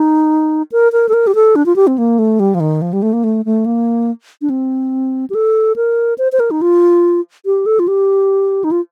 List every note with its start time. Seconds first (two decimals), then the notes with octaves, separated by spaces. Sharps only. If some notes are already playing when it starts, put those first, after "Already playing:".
Already playing: D#4
0.72 A#4
0.92 A#4
1.09 A4
1.13 A#4
1.27 G4
1.35 A4
1.56 D4
1.66 F4
1.76 G4
1.87 C4
1.98 A#3
2.19 A3
2.40 G3
2.55 F3
2.60 D#3
2.82 F3
2.93 G3
3.02 A3
3.13 A#3
3.24 A3
3.45 A3
3.66 A#3
4.42 D4
4.50 C4
5.30 G4
5.35 A4
5.76 A#4
6.18 C5
6.32 C5
6.40 A#4
6.51 D#4
6.62 F4
7.46 G4
7.66 A4
7.79 F4
7.88 G4
8.64 D#4
8.71 F4